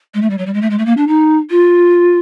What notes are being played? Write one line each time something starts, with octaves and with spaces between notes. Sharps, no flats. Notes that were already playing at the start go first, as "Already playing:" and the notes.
G#3
A3
G3
F#3
G3
G#3
A3
G#3
A3
A#3
D4
D#4
F4